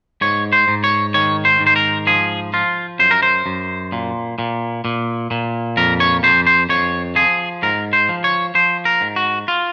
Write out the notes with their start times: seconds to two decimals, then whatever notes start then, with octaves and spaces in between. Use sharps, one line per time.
0.21 G#2 C#5
0.53 C5
0.68 G#2
0.84 C#5
1.14 D#3 C#5
1.45 C5
1.61 G#2
1.67 C5
1.76 A#4
2.07 F3 G#4
2.53 F3 F4
2.99 F#2 C5
3.11 A#4
3.23 C5
3.46 F#2
3.92 A#2
4.39 A#2
4.85 A#2
5.31 A#2
5.77 F2 A#4
6.00 C#5
6.23 F2 C5
6.47 C5
6.69 F2 C#5
7.16 F3 G#4
7.63 G#2 A#4
7.93 C5
8.09 F3
8.24 C#5
8.55 F3 C5
8.85 A#4
9.01 G#2
9.16 F#4
9.48 F4